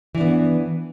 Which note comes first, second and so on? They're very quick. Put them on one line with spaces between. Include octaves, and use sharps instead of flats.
E3 D4 B3